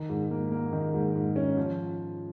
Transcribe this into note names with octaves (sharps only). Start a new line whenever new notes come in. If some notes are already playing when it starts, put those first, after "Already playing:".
Already playing: D#3
G#2
A#3
A#3
D#3
G#2
G#2
C#4
F3